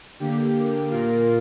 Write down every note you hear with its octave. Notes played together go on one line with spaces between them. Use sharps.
D3 A#3 G4
A#2 A#3 F4 A#4